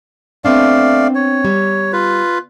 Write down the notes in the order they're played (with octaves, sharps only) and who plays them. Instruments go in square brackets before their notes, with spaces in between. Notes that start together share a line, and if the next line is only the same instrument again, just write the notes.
[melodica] A3 D5 F5 [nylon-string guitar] B3 C4 D4
[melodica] C#5
[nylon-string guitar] G3
[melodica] F4 B4